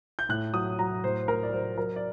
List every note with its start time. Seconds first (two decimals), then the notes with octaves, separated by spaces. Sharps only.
0.19 G6
0.29 A2 F#6
0.53 F#3 D#6
0.79 F#3 A#5
1.04 A2 C5
1.28 A2 A#4
1.43 D5
1.52 F#3 C5
1.77 F#3 A#4
1.96 D5